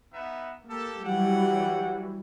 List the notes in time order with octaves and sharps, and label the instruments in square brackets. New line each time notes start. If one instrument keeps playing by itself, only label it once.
[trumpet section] B3 D#4 E5
[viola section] A#3 [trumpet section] G4 A4
[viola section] E3 F#3 G3 [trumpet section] F#5 G5